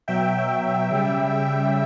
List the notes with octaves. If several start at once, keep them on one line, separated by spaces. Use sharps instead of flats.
B2 F#3 E5 G5
C#3 G3